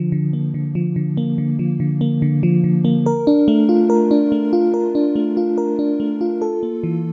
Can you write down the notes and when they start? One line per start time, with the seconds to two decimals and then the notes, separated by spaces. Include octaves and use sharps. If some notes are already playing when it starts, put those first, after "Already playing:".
Already playing: D3 F3
0.12 D3
0.33 A#3
0.54 D3
0.75 F3
0.96 D3
1.17 A#3
1.38 D3
1.59 F3
1.80 D3
2.01 A#3
2.22 D3
2.43 F3
2.64 D3
2.85 A#3
3.06 A#4
3.27 D4
3.48 A3
3.69 F4
3.90 A#4
4.11 D4
4.32 A3
4.53 F4
4.74 A#4
4.95 D4
5.16 A3
5.37 F4
5.58 A#4
5.79 D4
6.00 A3
6.21 F4
6.42 A4
6.63 A#3
6.83 E3